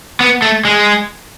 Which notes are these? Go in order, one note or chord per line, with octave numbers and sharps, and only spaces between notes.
B3
A3
G#3